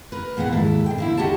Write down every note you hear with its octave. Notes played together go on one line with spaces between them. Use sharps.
A#4 B4
E2 A#2 A#3 B3 F#5
D#2 G#2 E4 A4
B2 G5
D3 A#3 E4
D2 D#4 F#4 G4 C#5 A5